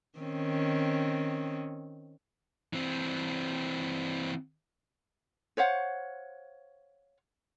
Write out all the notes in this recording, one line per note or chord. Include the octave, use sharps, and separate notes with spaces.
D#3 C4 C#4
E3 C4
C5 C#5 F5 F#5